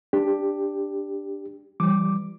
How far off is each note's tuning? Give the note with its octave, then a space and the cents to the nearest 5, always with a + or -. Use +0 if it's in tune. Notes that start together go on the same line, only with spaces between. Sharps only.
D4 +0 G4 +10
E3 +40 G3 +0 D6 +0